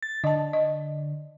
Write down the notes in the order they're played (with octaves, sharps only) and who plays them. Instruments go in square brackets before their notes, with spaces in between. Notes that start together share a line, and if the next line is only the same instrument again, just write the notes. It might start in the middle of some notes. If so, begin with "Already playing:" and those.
[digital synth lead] A6
[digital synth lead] D3 [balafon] D#5 A5
[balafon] D#5